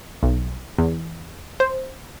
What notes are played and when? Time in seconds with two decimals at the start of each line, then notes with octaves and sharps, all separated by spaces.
0.23 B1
0.78 E2
1.60 C5